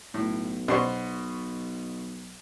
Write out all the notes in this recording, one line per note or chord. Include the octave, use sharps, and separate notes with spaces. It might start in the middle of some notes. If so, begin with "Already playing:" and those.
B1 A2
B2 B3 C#4 C5 D5 C#6